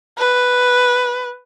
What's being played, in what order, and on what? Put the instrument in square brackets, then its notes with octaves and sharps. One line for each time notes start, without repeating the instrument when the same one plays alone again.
[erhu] B4